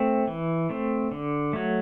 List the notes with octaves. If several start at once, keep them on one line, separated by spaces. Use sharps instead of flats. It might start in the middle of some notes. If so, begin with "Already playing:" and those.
Already playing: A3 C4
E3
A3 C4
D3
F#3 A3